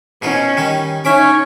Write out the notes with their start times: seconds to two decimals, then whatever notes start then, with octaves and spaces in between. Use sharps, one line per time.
0.22 B2 C#4 D#4 F4
0.57 D#3 G3 D#4
1.05 C#4 D#4 C#5 E5 B5 D6